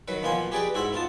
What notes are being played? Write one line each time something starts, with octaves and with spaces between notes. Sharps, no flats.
D#3 F#3 B4
B2 F3 A#3 B3 G#5 C6
G4 G#4 B4 D5 D#5 G5
G#2 E4 F#4 C5 E5
B3 D#4 F4 A5